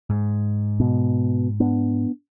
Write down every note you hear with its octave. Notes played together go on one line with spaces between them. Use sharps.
G#2
B2
B3 D4